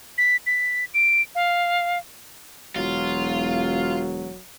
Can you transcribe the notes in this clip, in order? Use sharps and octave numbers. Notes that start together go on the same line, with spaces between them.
B6
B6
D7
F5
E1 F#3 F4